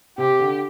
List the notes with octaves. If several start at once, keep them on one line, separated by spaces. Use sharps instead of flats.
C3 G4
D3